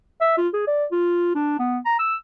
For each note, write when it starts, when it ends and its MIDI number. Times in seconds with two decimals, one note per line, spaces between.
0.21 0.35 76
0.37 0.48 65
0.54 0.63 68
0.67 0.85 74
0.92 1.34 65
1.35 1.55 62
1.59 1.78 59
1.85 1.97 82
1.99 2.15 88